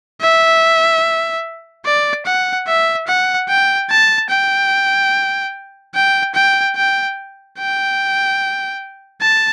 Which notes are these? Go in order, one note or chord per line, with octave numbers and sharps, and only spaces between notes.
E5
D5
F#5
E5
F#5
G5
A5
G5
G5
G5
G5
G5
A5